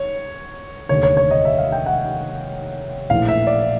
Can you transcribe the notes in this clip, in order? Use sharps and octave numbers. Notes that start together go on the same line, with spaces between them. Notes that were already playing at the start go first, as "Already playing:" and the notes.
Already playing: C#5
F1 D#2 D3 C#5
C#5
C#5
D#5
E5
F5
G5
F#5
A#1 A2 E3 F5
E5
D5